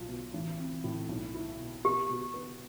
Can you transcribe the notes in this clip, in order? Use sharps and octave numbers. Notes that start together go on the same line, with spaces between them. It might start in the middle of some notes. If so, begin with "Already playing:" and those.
Already playing: B1 F4
B2
A1
C4
A2
B1
E4
B2
B2 G4
B2
B3